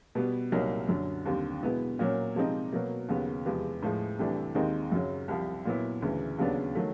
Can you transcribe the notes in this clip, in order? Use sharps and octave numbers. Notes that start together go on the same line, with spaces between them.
B2 G3 B3
C2 A#2 F#3 A#3 D#4
F#2 D3 F#3
D#2 D3 G3 C4
B2 G#3 B3 E4
A#2 F#3 A#3 C#4
C3 F3 G#3 C4 D#4
B2 F#3 A#3
D#2 C#3 F#3 B3
E2 C3 F3 G#3
A2 F3 G#3
C2 C3 E3 A3 D4
D#2 D#3 G#3 C4 D#4
F#2 C#3 F#3
C2 C3 F3
A#2 F#3 B3 E4
D2 C#3 E3
D#2 C#3 F#3 B3 D4
D#3 F#3 A3